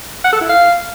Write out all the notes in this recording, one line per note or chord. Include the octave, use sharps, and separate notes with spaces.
F#5
A4
E4
F5